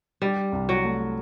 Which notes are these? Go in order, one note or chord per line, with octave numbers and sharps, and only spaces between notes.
G3 D4
C2
F#3
A3